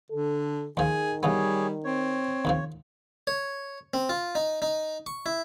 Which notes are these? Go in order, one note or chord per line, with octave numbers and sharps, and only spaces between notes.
D3 A4
D#2 D#3 F3 G#4
C#3 E3 G3 B3 G#4 C#5
C4 C#5
D#2 C#3 F3
C#5
C4
F4
D#4
D#4
C#6
E4